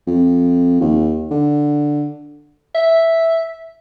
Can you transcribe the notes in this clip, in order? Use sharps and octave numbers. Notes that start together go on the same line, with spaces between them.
F2
D#2
D3
E5